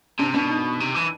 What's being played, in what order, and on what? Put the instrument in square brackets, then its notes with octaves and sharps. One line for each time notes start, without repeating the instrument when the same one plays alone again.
[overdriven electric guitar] C3 [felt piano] D4
[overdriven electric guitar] B2 [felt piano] D4
[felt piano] D#4
[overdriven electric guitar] C3
E3